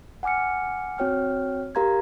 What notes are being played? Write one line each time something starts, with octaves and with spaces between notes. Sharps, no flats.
F#5 G#5 D6 F6 C#7
C4 F#4 C#5 G5 F6
G4 A#4 F5 A#5 C6 G#6